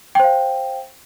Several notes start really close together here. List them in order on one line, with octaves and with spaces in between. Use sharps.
G5 C5 F5